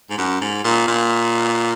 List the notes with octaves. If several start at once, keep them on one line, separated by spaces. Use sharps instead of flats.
G#2
F#2
G#2
A#2
A#2